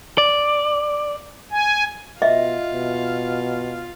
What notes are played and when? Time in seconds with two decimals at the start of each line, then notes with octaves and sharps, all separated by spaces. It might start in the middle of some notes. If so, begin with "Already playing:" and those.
0.18 D5
1.51 G#5
2.22 B2 F4 D#5 E5
2.73 B2